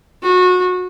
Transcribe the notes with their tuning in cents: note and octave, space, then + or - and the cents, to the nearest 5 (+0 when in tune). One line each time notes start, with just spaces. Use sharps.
F#4 -25